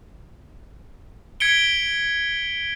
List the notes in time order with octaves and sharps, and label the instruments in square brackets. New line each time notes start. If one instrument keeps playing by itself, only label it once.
[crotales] G#6 B6 C#7 D7 G7